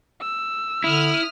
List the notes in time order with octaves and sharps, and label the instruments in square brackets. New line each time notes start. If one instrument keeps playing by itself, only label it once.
[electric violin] E6
[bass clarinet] D3 [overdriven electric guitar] E4 [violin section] D#6 F6